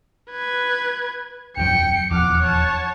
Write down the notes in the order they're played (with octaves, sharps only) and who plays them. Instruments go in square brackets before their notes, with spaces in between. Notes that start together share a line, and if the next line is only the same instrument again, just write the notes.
[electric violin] B4 G#6
[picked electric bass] D#1 F2 F#3 [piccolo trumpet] G5 [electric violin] C#7
[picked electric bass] D#1 E2 F3 [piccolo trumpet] F#5 [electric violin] D6 F6
[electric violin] C#5 A5